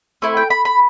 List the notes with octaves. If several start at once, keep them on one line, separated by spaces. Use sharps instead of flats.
A3 C4 E4
G5
B5
B5